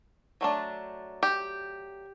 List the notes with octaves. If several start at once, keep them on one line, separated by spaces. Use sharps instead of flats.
F#3 A3 D4
G4